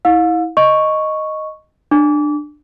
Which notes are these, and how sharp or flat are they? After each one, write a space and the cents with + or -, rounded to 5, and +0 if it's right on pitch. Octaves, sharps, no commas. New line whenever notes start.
E4 -25 F5 +35 E6 +20
D#5 +0 C#6 +0
D4 +20 D6 -30